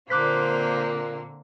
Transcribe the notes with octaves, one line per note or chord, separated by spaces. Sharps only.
A#2 D3 A#3 C4 C5 D6 F#6 B6